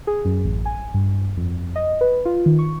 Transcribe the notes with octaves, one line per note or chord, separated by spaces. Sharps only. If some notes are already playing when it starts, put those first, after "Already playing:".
G#4
F#2
A1
G#5
G2
F2
D#5
B4
F4
D#3
C#6